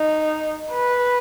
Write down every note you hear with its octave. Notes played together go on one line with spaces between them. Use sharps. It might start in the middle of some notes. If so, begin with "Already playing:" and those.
Already playing: D#4
B4